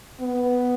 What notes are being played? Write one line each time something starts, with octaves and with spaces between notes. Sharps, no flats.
B3